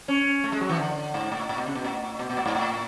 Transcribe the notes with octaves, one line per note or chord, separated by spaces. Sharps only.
C#4
A3
G#3
F#3
E3
D3
G#2
A2
A2
B2
C#3
B2
A2
B2
B2
A2
G#2
A2